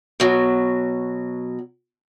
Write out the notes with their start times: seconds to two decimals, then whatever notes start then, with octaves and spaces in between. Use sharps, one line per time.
0.20 B2 F#3